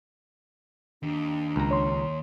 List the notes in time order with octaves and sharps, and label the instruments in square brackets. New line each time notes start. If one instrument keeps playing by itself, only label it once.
[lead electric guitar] D#2 [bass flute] D4
[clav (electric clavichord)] C#2 A#5
[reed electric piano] C#5 C6